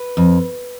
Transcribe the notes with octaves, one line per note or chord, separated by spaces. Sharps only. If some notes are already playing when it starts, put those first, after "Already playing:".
Already playing: B4
F2